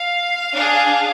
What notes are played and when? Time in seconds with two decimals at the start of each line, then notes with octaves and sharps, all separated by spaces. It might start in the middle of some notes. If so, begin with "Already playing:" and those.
Already playing: F5
0.55 D4 G#4